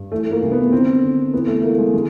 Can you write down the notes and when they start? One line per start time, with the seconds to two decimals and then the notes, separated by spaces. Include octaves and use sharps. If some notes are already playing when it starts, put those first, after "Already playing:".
Already playing: G2
0.12 E3 A3
0.31 A#3
0.43 C2
0.52 B3
0.72 D3 C4
1.03 D3
1.33 E3 B3
1.48 A3
1.63 E3 A#3
1.78 G#3
1.93 D3 G#3